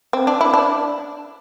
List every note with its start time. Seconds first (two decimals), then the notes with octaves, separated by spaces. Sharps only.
0.13 C4
0.27 D4
0.41 E4
0.54 D4